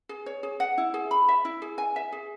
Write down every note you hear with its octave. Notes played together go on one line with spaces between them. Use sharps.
G#4
C#5
G#4
F#5
E4
G#4
B5
E5
E4
G#4
G#5
E5
G#4